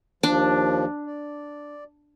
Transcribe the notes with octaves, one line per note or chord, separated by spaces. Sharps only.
D#2 F3 D4
D5